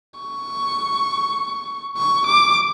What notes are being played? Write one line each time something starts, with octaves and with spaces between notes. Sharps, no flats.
C#6
C#6
D6